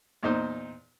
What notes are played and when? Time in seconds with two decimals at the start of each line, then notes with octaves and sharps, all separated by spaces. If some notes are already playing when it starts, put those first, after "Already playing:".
0.23 E2 A#2 D#4 C5 C6